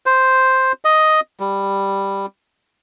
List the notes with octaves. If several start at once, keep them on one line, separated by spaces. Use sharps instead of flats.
C5
D#5
G3